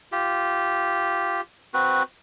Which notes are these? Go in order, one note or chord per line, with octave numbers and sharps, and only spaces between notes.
F4 G4
C4 F#4 B4